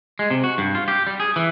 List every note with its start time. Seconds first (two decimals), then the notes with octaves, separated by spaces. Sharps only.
0.19 G#3
0.31 C3
0.44 F#4
0.58 G2
0.75 F4
0.88 G4
1.07 G3
1.20 G#4
1.36 E3